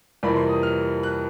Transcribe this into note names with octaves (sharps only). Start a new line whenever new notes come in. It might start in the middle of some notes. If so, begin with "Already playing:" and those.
F2 C3 E3 G3 A#3 B5
C6
D#6
F6
F#6